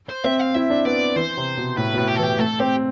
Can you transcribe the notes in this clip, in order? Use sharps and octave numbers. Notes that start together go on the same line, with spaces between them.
C5
C4 E5
F5
E4 E5
D4
B3 D5
E3 C5
C3
B2
A2 B4
B2
A2
G4
E3 A4
G4
A3 A4
C4 G4